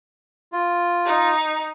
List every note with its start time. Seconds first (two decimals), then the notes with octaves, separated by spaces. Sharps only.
0.52 F4
1.06 D#4